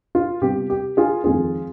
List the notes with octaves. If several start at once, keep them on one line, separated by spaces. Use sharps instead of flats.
F4
C3 G3 B3 G4
G4
F4 G#4
F2 D#3 G#3 C4 F4 G#4